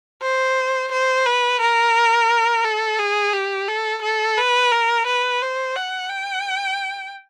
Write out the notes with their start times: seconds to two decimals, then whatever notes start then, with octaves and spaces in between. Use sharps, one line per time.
0.22 C5
0.92 C5
1.26 B4
1.61 A#4
2.64 A4
2.99 G#4
3.33 G4
3.68 A4
4.02 A4
4.38 B4
4.72 A#4
5.07 B4
5.42 C5
5.76 F#5
6.10 G5